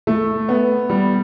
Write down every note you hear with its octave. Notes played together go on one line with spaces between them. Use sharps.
A3
B3
G3